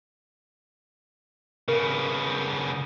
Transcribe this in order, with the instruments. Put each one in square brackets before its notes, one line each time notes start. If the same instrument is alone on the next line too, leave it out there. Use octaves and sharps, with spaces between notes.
[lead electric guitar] C#3 B3 [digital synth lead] A#4